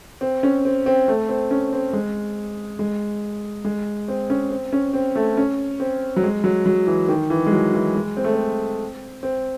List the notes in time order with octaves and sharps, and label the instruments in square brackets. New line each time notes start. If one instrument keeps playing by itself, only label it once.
[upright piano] C4
C#4
C4
C4
A3
C4
C#4
C4
G#3
G#3
G#3
C4
C#4
C4
C#4
C4
A3
C#4
C4
F#3
G#3
F#3
F#3
E3
D#3
E3
G#3
F#3
E3
G#3
C4
A3
C4
C4